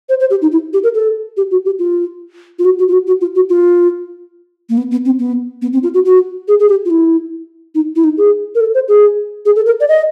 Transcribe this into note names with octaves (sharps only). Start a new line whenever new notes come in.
C5
C5
G4
D#4
E4
G4
A#4
A4
G4
F#4
G4
F4
F4
F#4
F#4
F4
F#4
F#4
F4
F#4
F4
A#3
B3
B3
C4
B3
B3
C4
F4
F#4
F#4
G#4
G#4
G4
F4
E4
D#4
E4
D#4
G#4
A#4
A4
C5
G#4
G#4
A4
A#4
D5
D#5